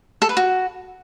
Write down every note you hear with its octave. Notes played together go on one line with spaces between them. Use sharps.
A4
B4
F#4